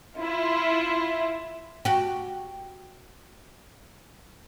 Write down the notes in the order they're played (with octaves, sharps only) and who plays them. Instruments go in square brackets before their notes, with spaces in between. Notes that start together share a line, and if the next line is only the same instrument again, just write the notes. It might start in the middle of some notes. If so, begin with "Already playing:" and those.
[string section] E4 F4
[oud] F#4 G4